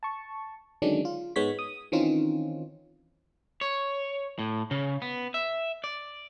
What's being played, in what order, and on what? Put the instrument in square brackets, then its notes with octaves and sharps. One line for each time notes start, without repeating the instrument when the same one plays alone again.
[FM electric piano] A5 C#6
D3 D#3 F#3 G#3 C#4 D4
F4
G#2 G#3 B3 C#5 B6
D#6
D#3 E3 C4 C#4 D#4 F4
[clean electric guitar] C#5
A2
C#3
B3
E5
D5